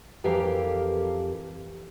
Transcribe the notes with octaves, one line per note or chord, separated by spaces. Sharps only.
F2 E3 G4 A#4 F5